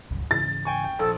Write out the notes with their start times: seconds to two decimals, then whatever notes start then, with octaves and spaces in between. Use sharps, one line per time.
0.11 D1 C2 F#2
0.31 G#2 C#3 E3 A6
0.65 G5 G#5 C#6
0.84 G5
0.99 A#1 A4